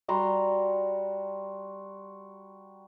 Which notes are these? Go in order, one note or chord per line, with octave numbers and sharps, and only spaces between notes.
G3 F#4 A#5 C6